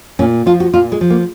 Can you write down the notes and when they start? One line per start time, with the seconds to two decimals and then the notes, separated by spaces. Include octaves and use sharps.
0.19 A#2 C#4
0.46 F3 F4
0.60 F#4
0.73 A#2 F4
0.92 G#3
1.01 F3
1.10 A#3